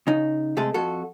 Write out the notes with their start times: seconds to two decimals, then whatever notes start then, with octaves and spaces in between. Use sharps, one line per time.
0.07 C#3 D#4
0.57 C3 G#3 A3 G#4 A4
0.74 F2 F#4 A4